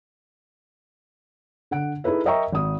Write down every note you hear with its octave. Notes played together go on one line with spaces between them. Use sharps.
D3 F#5 D7
D#4 E4 G#4 A4 B4 E5
A#4 D#5 E5 G5 A#5 C#6
G#1 D#6